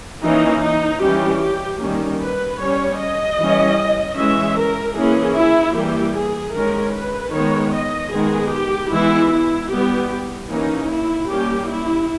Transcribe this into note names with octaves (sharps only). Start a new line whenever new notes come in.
E3 A#3 C#4 D#4
D#4
E3 G3 C#4 G4
G4
D#3 G3 A#3 C#4
B4
G3 C#4 C#5
D#5
E3 G3 C#4
E3 G#3 C#4 E5
A#4
E3 A#3 C#4 G#4
E4
E3 G3 A#3 G4
G#4
D#3 G#3 C#4 A#4
B4
D#3 G#3 B3 C#5
D#5
D#3 G#3 B3 G#4
G4
E3 G#3 B3 E4
E4
G3 B3 G4
E3 A#3 C#4 D#4
E4
G3 A#3 C#4 G4
E4